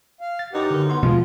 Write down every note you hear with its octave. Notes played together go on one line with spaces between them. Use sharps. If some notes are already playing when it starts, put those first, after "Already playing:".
F5
A6
F#2 E3 D#4 G4 F#5
D3 A#4
B3 F#5 C6
B2 F3 G#3 F4